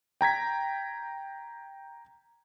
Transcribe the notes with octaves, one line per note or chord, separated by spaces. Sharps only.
G5 A#5 G#6 B6